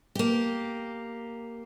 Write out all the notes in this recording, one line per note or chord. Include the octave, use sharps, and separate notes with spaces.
A#3 G4